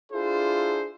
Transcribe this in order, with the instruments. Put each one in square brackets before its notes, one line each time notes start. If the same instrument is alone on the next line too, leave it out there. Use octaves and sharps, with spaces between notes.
[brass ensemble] D4 E4 F4 G#4 A4 C5